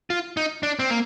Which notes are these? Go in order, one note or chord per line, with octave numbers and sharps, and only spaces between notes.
F4
D#4
D4
C4
A#3